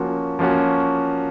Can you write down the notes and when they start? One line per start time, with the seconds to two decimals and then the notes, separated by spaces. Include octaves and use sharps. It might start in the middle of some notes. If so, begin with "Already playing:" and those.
Already playing: F3 A#3 C#4 F#4
0.39 F3 A#3 C#4 F#4